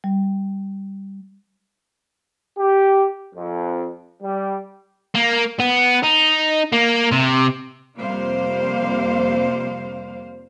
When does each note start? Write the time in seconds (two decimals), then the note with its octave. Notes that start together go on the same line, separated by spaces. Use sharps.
0.04 G3
2.58 G4
3.35 F2
4.22 G3
5.15 A#3
5.60 B3
6.03 D#4
6.72 A#3
7.11 C3
7.98 F2 C3 G3 A#3 C5 F5